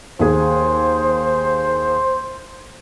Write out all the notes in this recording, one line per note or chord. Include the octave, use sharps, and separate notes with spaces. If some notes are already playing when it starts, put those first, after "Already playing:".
D#2 G#4 C5